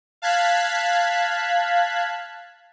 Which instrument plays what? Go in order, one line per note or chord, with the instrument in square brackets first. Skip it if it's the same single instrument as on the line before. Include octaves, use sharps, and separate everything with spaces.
[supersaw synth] F5 A5 F#6 G#6 B6